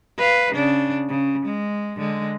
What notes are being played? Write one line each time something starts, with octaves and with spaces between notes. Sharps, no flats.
B4 F5
C#3 D4
C#3
G#3
D3 G#3